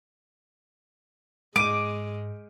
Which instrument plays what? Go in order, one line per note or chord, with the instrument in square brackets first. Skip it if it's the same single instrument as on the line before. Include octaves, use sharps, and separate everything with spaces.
[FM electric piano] G#2 [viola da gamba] G#3 [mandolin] D6 [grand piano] D7 D#7